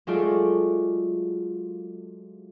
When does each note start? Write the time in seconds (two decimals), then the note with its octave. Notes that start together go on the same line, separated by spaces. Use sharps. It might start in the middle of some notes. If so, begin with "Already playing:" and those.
0.07 F#3 G#3 A3 F4 D5